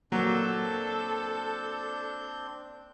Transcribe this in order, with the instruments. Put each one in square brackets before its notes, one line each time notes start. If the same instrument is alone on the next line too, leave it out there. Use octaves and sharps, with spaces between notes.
[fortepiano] F#3 [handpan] A#3 [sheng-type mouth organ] C4 D4 G6 [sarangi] A4